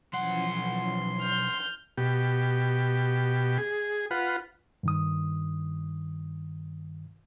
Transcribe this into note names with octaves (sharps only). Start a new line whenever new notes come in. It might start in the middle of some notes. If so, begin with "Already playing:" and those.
B1 E3 F3 C#4 F#5 C6
F6 G6
B2 G4
G#4
F4 B4 F#5
G2 D#3 D#6